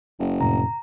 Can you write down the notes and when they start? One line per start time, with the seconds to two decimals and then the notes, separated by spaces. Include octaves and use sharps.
0.19 F#1
0.41 F2 A2 C3 A#5